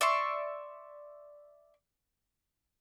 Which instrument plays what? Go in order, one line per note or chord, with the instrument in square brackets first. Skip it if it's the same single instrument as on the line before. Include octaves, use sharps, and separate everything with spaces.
[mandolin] D5 E5 C6 C#6